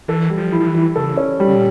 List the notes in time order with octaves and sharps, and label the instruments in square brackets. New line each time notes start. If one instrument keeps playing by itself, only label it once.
[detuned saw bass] E3 [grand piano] A4
[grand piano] G3
[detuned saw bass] F3
[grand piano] E4
[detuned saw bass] F3
E3
[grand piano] E4
[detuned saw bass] C#3 [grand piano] A4
[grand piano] C#4
G3
[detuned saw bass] C#3
A#2